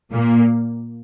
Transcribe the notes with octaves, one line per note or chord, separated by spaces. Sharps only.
A#2 A#3